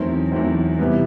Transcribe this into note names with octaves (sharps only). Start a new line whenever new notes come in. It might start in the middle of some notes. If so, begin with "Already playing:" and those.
Already playing: E2 D#3 F#3 A3 C4
E2 D#3 F#3 A3 C4
C3 E3 G3 B3